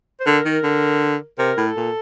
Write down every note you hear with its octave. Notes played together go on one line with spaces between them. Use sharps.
C5
D3 A#4
D#3
D3
C3 A#4
A2
A4
A#2